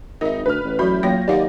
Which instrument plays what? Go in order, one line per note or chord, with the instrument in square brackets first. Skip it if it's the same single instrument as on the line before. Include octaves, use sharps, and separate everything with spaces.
[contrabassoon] G#1 [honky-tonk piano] D#4 [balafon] A#4 E5
[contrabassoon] D2 [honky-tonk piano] B4 F6
[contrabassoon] A1
[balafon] F#3 F#4 [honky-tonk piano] E5 B5 G6
[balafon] F#3 A#3 G5 [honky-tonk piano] F4 C#5 A#6
[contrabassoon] D#2 [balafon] G4 F5 F#5 [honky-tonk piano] D5 D#5